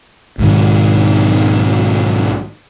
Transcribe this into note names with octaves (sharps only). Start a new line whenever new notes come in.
B1 G#2 D#3